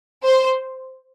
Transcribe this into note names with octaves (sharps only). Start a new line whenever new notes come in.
C5